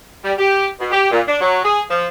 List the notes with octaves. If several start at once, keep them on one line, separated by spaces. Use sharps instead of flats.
G3
G4
B2
G4
A#2
D4
F#3
G#4
F3